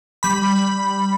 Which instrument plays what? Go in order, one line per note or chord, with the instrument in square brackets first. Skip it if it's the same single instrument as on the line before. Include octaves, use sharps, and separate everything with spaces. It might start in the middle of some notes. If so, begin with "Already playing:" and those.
[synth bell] G3 B5